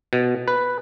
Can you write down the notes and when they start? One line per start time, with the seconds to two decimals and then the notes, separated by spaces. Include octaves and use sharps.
0.13 B2
0.48 B4